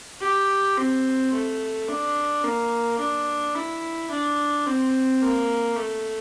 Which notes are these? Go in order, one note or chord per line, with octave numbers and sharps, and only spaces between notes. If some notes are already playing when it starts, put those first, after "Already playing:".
G4
C4
A3
D4
A#3
D4
E4
D4
C4
A#3
A3